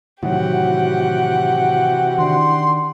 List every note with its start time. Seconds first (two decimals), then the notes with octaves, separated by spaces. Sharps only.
0.23 A2 C3 D#3 E3 F#3 F#4 G4 F#5
2.18 D#3 D4 C6